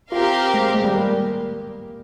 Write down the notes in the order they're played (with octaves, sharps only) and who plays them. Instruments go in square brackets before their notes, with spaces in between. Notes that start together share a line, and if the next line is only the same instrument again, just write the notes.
[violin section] C4 G4 A#4 F5 [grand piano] F4
[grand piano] G#3
G#3
G3
A#3